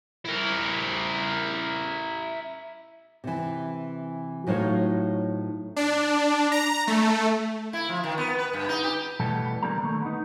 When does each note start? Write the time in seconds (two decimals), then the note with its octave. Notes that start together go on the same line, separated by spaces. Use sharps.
0.25 E4 A#4
3.24 C3 E3
4.47 A2 F#3 D#4 F4 C5 C#5
5.76 D4
6.52 A#5
6.87 A3
7.73 E4
7.89 F3
8.04 D#3
8.18 B3
8.38 B4
8.53 G2
8.69 D#4
8.84 G4
9.20 B2 E3 G3 A3 B3 A5
9.63 B1 D3 G3 A#3 A#5
9.82 D3 D#3 A3
10.01 B3 D#4